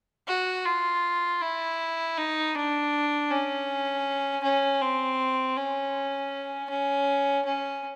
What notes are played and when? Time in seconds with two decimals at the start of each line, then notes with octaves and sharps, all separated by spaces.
0.28 F#4
0.66 F4
1.41 E4
2.17 D#4
2.55 D4
3.30 C#4
4.43 C#4
4.81 C4
5.56 C#4
6.70 C#4
7.45 C#4